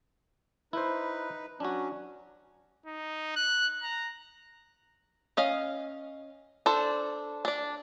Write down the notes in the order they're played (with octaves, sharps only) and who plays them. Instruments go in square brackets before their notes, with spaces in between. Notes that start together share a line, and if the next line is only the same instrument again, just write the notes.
[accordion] D#4 B4 [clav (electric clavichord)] E4 C5
[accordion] F#3 C#4 [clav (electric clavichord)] D4 F#4
[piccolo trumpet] D#4
F#6
A#5
[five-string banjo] C#4 D#5 F5
D4 A4 C5
D4 D5